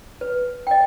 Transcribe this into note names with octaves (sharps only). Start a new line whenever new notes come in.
B4
D#5 G5